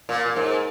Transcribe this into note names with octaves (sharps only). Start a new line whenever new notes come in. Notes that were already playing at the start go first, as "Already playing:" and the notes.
A#2
A#2
G#2